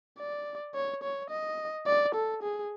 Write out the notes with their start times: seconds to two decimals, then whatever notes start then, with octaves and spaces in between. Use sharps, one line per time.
0.19 D5
0.75 C#5
1.03 C#5
1.30 D#5
1.87 D5
2.15 A4
2.43 G#4